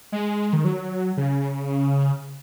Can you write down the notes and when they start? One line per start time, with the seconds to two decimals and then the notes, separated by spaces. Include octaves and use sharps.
0.12 G#3
0.53 D#3
0.65 F#3
1.17 C#3